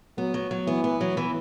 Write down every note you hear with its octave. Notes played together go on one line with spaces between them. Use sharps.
F#3 B3
F#3
F#3
E3 B3
B3
F#3
E3